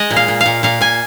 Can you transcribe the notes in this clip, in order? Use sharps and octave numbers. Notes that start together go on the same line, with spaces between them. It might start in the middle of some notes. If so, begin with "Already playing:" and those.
Already playing: G#3 D#5
A#2
F5
A#2
F5
A#2
A#2 F5
A#2 G#5